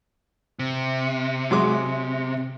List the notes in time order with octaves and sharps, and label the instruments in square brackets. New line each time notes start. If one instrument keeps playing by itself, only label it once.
[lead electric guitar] C3
[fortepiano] F#3 G#3 D6